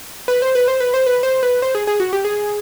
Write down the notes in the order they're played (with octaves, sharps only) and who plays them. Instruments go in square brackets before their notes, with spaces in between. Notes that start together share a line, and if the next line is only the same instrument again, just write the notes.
[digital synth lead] B4
C5
B4
C5
B4
C5
B4
C5
B4
C5
G#4
G#4
F#4
G4
G#4